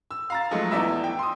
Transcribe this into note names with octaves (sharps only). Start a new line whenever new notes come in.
E6
F5 A#5 A6
F3 F#3 G#3 A3 D#4
E2 E3 D5 E5 A#5 E6
G5
C6 D#6